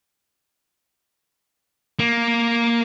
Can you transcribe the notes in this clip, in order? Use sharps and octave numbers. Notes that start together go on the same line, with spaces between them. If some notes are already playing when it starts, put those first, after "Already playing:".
A#3